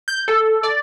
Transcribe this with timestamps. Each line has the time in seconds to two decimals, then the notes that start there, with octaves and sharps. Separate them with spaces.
0.08 G6
0.28 A4
0.63 D5